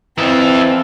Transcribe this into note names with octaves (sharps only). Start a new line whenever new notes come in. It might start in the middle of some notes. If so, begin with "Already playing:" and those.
F2 E3 C4 A4